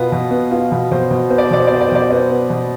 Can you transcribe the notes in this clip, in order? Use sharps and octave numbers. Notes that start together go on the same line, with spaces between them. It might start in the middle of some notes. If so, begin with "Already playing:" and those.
Already playing: B2 B3 F4
B2
B3
B3 F4
B2
B2 C5
B2
B3 C5
D5
C5
B2 D5
C5
D5
B3 C5
D5
C5
B2 D5
C5
B3 D5
C5
B3
B2